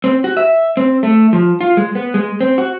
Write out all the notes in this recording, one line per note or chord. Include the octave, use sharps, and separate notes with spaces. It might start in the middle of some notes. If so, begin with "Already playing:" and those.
C4
F#4
E5
C4
A3
F3
F4
G#3
B3
G#3
C4
F#4